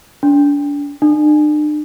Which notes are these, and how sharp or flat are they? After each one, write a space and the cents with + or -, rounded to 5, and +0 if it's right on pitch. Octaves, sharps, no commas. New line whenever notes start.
D4 -35
D4 +40